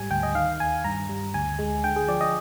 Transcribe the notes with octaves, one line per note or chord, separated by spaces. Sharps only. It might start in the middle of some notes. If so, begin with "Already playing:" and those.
Already playing: G#2 G3 G#5
D2 G5
D#5
D#3 F5
D#2 G#5
G2 A#5
G3
D2 G#5
G#3
D3 G5
G#4
F3 D5
D#5